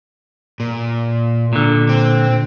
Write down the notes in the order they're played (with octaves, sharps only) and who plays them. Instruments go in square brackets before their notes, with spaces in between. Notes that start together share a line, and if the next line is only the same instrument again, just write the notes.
[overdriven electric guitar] A#2
[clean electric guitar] A#2 D3
[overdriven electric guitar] C4